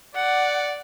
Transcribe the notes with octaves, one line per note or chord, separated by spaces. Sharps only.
D5 F#5